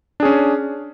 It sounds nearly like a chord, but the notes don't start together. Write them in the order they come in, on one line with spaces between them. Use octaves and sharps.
D4 G#4 C#4